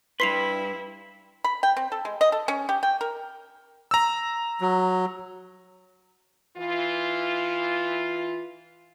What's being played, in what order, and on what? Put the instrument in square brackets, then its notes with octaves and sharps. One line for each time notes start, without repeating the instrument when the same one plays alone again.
[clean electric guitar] G2 B4 [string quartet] E4 [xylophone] C6 C7 F7 [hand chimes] B6
[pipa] B5
G5
C4
A4
G#3
D#5
A4
C#4
G4
G5
A#4
[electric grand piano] A#5 E6
[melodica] F#3
[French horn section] E3 F4